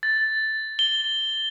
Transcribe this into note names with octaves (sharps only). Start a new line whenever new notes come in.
A6
G7